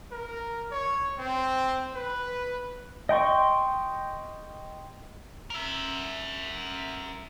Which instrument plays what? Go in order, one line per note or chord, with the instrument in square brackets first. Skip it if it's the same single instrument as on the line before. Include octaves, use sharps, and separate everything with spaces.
[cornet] A#4
C#5
C4
B4
[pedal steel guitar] D#5 G5 C6 C#6
[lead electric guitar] A#4 E5